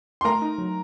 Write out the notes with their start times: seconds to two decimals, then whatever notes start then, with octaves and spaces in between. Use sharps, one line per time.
0.21 C6
0.25 A3 A#4 A#5
0.42 D#4
0.58 F#3